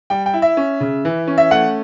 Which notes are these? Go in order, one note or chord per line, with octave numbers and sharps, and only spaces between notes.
G3 G5
G5
E4
E5
C#4
C#3
E3
C#4
E5
A3 F#5